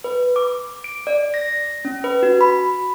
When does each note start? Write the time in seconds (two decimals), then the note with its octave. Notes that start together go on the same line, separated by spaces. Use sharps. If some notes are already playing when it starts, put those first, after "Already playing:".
0.04 B4
0.36 D6
0.84 D7
1.07 D5
1.34 A#6
1.85 C#4
2.04 B4
2.23 F#4
2.41 B5